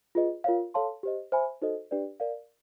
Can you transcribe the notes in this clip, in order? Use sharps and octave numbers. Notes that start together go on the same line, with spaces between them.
F4 G#4 B4 D#5
F4 A#4 C#5 F5
A4 C#5 F5 A5 C6
G4 C5 D#5
C5 E5 G#5 B5
D#4 F#4 A4 C5 D#5
D4 G4 B4 D5
A#4 D5 F5